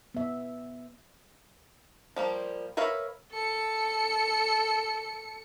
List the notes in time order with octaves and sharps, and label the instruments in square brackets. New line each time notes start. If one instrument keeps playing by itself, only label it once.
[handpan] B3 E5
[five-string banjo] F3 G3 A#3
A#4 B4 C#5 E5 F5
[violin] A4 C#7